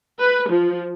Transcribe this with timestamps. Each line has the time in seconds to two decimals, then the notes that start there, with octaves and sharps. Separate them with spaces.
0.20 B4
0.50 F3